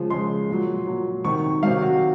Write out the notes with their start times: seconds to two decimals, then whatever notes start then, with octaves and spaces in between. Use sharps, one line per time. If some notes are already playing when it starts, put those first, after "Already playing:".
Already playing: C#3 F3 G#3
0.10 C#3 F3 G#3 C6
0.49 A#2 F#3
0.87 A#2 F#3
1.25 C3 D#3 F#3 C#6
1.63 C3 D#3 F#3 F5
1.82 F#4